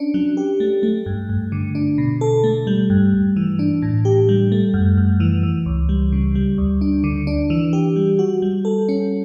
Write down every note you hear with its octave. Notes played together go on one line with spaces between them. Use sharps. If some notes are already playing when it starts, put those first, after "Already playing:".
Already playing: C#4 D4
F#3
G4
A3
A3
G2
G2
D3
D4
B2
A4
A3
G3
G2
G2
E3
D4
A2
G4
G3
A3
F#2
F#2
E3
E3
C#2
G3
C#3
G3
D2
D4
D3
D4
E3
G4
G3
F#4
G3
A4
C#4